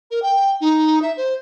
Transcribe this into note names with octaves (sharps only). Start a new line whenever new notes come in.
A#4
G5
D#4
E5
C5